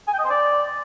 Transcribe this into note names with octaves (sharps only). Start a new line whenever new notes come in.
G#5
G5
D#5
C5
D5